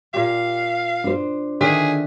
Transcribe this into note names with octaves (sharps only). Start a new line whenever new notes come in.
A#2 G4 F5
D4 C5
D3 D#3 G#4 E5